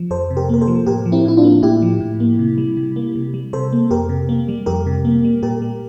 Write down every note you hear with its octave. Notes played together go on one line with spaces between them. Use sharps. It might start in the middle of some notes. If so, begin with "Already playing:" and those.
Already playing: F3
F2 A4 C5
C3
G4 A#4
A#3 A#4
A4 C5
F3
A2 G4 A#4
F3
C4 E4
A2 E4
D4 F4
A#3
A2 E4 G4
F3
A2
A#3
C3
G3
C3
A#3
C3
G3
C3 A4 C5
A#3
F2 G4 A#4
C3
A#3
G3
F2 G4 A#4
C3
A#3
G3
A#2 G4 A#4
G3